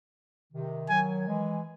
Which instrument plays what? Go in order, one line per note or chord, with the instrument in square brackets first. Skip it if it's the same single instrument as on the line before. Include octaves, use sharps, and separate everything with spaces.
[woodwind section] C3 D#3
[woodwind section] D#3 F#3 [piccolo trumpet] G#5
[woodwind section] E3 G#3